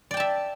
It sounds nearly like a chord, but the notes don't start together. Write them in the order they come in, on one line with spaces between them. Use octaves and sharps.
D5 G5 A5 E5